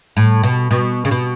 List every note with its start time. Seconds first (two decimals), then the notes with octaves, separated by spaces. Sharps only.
0.17 A2
0.43 B2
0.71 B2
1.05 C#3
1.11 B2